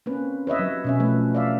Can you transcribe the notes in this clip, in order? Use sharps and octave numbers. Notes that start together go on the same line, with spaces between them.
A#3 C4 C#4 B4
B4 C#5 D#5 E5
F#3
B2 C#4 E5
F3 A3 B4
D5 E5 F5